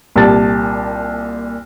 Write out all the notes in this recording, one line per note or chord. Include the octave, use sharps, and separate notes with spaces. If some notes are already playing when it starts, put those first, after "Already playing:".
C2 A#2 G4 A5 A6